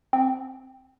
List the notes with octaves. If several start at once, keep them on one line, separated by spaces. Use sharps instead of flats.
C4